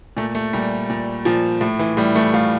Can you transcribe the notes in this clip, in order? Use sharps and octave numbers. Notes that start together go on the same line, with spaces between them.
A#2 A3
A3
A#2 G3
A#2
A#2 F3
A2
E3
A2 G3
E3 A3
A2 F4